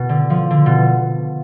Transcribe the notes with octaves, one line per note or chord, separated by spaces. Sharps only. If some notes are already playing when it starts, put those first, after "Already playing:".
Already playing: B2
D3
F3
D3
B2